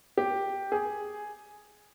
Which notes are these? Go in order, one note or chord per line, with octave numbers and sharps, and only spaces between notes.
G4
G#4